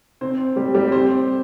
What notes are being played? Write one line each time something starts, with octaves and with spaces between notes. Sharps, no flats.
C4 C5
G3 G4
G3 G4
C4 C5